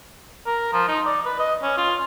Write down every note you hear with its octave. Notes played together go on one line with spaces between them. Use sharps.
A#4
F3
D#4
D5
B4
D#5
C#4
F4